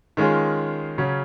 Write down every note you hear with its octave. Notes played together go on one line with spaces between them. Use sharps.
D#3 G#3 C#4 F4 G#4
C#3 F#3 C#4